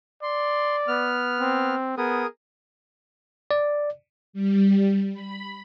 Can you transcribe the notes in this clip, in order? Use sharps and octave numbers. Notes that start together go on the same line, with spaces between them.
D5 C6
B3 F6
C4
B3 G#4 A#4 D#6
D5
G3
B5